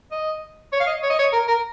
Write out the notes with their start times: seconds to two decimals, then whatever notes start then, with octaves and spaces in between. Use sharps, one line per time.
0.12 D#5
0.73 C#5
0.80 F5
0.87 D#5
1.03 C#5
1.10 D#5
1.19 C#5
1.33 A#4
1.48 A#4